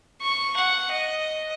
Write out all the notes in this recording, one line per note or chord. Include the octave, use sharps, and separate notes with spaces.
C#6
F#5
D#5